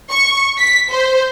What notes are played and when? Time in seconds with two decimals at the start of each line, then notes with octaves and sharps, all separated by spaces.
0.10 C#6
0.58 B6
0.91 C5